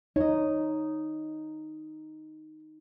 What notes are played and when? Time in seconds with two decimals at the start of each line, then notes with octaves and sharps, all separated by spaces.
0.16 D#4 C#5 D#5